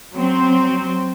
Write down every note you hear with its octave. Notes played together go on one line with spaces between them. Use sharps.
F#3 C4